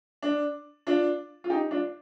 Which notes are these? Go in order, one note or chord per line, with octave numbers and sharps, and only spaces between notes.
D4
D4 F4
F4
D#4 G4
D4 F4